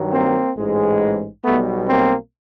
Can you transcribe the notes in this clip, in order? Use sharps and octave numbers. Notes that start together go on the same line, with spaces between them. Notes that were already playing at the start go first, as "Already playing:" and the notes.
Already playing: G2 D#3 F#3
A#3 C4
A1 G#2 E3 G#3
B1 B2 G3 A3 B3
A#3 C4